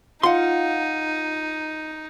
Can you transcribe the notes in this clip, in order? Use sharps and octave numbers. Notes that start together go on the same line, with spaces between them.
D#4 F4 F5 F#5 C6